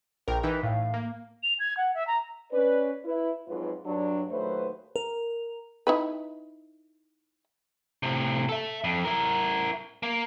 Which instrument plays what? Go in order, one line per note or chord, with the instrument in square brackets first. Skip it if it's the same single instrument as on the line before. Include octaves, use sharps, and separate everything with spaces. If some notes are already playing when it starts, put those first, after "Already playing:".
[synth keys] A#1 A#4 [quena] G5
[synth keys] E3 D#4 G5 [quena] B4
[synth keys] A2 [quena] F5
[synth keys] A#3
[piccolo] F7
G#6
F#5
E5
A#5
[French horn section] C#4 B4 D5
E4 B4
F2 G#2 F#3 F4 B4
G2 F#3 D4
D#2 A#2 F#3 A3 B4 C5
[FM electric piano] A#4
[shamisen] D#4 E4 B4
[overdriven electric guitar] A2 C3
A4 E5
F2
E4 A#4
A#3